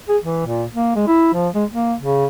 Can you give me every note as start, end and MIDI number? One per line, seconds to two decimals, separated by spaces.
0.09 0.18 68
0.23 0.44 52
0.46 0.64 46
0.73 0.92 58
0.96 1.04 56
1.08 1.33 64
1.34 1.49 53
1.55 1.65 56
1.71 1.94 58
2.00 2.26 49